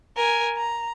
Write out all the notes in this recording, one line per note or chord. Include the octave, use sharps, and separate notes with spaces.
A#4 G#5
A#5